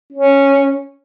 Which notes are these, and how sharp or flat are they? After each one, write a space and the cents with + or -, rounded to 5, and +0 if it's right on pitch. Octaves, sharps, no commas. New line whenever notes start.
C#4 -5